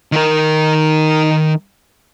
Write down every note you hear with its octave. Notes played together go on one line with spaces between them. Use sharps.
D#3 A#4